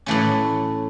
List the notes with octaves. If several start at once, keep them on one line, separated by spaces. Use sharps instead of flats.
A2 E3 A3 C#4